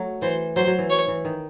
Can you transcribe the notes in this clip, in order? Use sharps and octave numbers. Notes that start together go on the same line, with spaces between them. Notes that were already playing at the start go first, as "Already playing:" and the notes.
Already playing: F#3 A3
E3 C5
F#3 C5
F#3
E3
C#5
E3
D#3